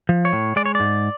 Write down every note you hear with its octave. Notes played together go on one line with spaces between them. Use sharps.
F3
C#5
A2
G#3 D5
C#5
G#2 D5